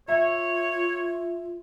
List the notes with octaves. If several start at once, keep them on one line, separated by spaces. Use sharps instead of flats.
F4 C#5 E5